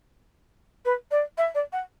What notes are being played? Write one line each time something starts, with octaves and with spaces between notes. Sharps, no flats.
B4
D5
E5
D5
F#5